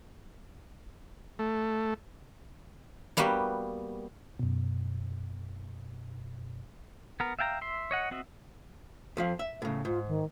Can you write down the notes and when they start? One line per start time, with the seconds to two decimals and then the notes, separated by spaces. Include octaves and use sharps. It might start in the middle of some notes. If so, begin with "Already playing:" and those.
1.39 A3
3.17 G3 A#3 B3 F#4 G4
4.39 F#2 B2
7.20 B3 A#4
7.39 E5 F5 G5 A5 A#5
7.61 E5 C6
7.91 C#5 D#5 F#5
8.11 C4 F#4 D#5 E5
9.17 F2 F3 F5
9.39 E5
9.62 A2 C#3
9.85 G#2 F4
10.08 D#3